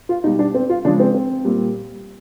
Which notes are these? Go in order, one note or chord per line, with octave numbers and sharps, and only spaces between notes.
F4
B2 G3 D#4
D4
C4
F4
C#3 F3 G#3 D4
C4
C4
A#2 G3